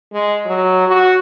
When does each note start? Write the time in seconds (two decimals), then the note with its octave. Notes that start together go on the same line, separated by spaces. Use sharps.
0.13 G#3
0.46 F#3
0.88 F#4